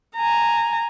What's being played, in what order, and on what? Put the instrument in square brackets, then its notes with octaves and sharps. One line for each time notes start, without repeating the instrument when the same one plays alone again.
[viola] G#5 A#5